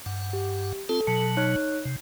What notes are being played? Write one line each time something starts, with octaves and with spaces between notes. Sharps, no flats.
G2 F#5
G4
C4 F4 A4 A5
B2 F#3 A5
D#4 C#5 F#6
C3